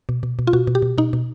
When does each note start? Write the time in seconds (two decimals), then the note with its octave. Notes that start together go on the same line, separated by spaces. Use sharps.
0.09 B2
0.23 B2
0.39 B2
0.47 F4
0.53 B2 F#4
0.67 B2
0.75 G4
0.82 B2
0.98 B2 D#4
1.13 B2